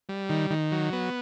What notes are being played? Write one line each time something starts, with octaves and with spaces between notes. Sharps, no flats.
G3
D#3
D#3
F#3
B3